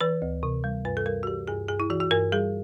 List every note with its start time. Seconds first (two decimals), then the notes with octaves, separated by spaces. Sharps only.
0.01 E3 B4
0.22 D2
0.43 C3
0.64 G3
0.85 G2 B4
0.97 A4
1.06 G3 A#4
1.23 F#4
1.27 E3 G4
1.48 G2 G#4
1.68 G2 G#4
1.80 E4
1.90 E3 F#4
2.00 F#4
2.11 G2 A#4
2.32 G3 G#4